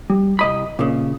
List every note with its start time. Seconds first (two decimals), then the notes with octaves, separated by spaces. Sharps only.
0.10 G3
0.39 C2 D#5 B5
0.79 A#2 C#3